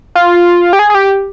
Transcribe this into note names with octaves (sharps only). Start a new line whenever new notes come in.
F4
G4
G#4
G#4
G4